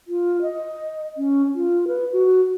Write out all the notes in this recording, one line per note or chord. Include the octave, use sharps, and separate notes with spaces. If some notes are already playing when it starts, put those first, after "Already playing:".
F4
D#5
C#4
F4
B4
F#4